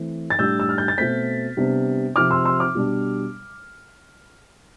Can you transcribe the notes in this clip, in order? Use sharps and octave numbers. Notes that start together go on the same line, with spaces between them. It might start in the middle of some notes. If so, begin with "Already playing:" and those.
Already playing: E3 A3 C4
A6
A2 G3 D4 E6 G6
E6
F6
G6
A6
B2 A3 C4 G6 B6
C3 G3 B3 D4
C3 F3 C4 D6 F6
C6 E6
C6 E6
D6 F6
B2 G3 D4